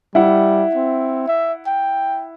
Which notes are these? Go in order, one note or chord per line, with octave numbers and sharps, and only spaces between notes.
G3 E4 F#5
C4
E5
G5